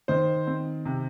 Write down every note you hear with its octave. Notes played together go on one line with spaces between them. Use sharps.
D#3 C5
C4
C3